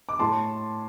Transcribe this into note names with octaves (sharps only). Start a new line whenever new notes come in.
D6
A2 A5 C6